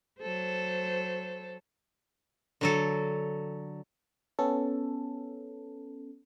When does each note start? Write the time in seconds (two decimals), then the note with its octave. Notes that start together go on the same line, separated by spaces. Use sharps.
0.20 F#3 A4 C5
2.61 D3 F#3 A4
4.39 B3 C#4 A4